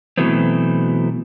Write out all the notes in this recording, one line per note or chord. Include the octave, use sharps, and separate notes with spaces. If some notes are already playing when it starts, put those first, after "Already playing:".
B2 E3 F#3 A3 B3 C4